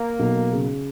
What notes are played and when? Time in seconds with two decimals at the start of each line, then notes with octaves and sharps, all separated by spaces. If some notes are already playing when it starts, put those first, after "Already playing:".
Already playing: A#3
0.19 B1
0.51 C#3